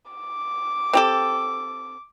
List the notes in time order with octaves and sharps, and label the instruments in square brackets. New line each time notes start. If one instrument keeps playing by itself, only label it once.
[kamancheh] D6
[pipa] C4 G4 A4